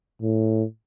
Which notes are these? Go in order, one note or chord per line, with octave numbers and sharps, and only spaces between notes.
A2